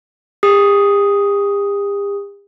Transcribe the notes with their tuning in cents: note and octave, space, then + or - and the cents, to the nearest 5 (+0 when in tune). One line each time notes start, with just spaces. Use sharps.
G4 +45 D#6 +0